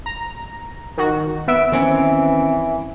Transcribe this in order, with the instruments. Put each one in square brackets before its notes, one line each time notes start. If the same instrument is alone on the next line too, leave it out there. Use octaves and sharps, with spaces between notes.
[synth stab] A#5
D#3 F#4
B3 E5 D7
[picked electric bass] D#3 C4 C#4 [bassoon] E3